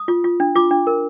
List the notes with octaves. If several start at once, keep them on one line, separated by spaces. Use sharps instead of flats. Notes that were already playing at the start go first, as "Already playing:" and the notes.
Already playing: D#6
F4
F4
D4
F4 D6
D4
A#4